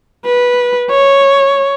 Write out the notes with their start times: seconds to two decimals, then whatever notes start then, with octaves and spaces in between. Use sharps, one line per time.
0.25 B4
0.90 C#5